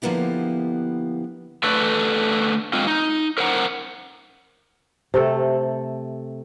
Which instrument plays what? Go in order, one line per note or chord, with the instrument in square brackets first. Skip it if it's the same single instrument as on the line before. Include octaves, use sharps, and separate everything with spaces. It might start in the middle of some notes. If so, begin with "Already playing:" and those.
[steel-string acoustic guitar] D3 F3 A#3 B3 E4 G4
[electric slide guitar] D3 A3 A4 B4
G#3 C4 F4
D#4
A#4 C5 F#5 A#5
[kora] C3 A3 A4